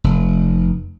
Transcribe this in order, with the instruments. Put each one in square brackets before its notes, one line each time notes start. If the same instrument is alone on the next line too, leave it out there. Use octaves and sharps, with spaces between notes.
[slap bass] F1